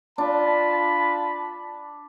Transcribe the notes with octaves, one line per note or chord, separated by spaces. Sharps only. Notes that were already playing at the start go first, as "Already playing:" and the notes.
D4 F4 A5 B5